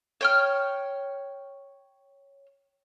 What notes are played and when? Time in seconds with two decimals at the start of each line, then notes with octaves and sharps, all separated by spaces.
0.21 C#5 G5 F6